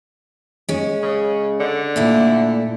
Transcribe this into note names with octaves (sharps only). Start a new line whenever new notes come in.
G#3 C#4
C#3
D3
A#2 A3 E4